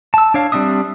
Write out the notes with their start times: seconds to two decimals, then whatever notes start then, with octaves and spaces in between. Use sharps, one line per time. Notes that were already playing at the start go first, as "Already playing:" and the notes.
0.14 A5 E6
0.34 D4 C#5 F5
0.52 G3 C4 D4 E5 D#6